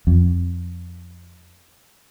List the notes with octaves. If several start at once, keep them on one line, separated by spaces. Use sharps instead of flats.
F2